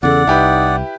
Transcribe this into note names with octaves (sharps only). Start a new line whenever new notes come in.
E2 C#3 A4 D5 F#5
C2 D#4 E4 G4 B4